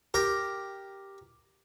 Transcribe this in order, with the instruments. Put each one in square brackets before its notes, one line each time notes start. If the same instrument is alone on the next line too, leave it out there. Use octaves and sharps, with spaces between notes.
[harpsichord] G4 A#4